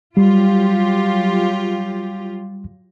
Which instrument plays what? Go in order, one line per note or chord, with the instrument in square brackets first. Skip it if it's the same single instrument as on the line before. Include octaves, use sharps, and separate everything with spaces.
[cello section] F#3 F4 G4 [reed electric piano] G3